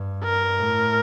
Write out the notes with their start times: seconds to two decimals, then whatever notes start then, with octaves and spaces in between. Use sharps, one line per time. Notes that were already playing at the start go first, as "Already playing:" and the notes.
Already playing: G2
0.24 A#4
0.59 A2